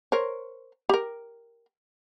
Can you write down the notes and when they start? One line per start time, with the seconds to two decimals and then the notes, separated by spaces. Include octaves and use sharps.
0.12 A#4 C5 C#5
0.89 G4 A#4